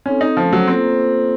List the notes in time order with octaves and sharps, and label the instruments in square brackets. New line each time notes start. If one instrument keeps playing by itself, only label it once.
[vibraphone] C4 D#4 A4 [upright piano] C#4
[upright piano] D#4
[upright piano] F3 [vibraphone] A3 C#4 A4 C5
[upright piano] F#3
[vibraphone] A#3 F4 A4 C5 [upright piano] C4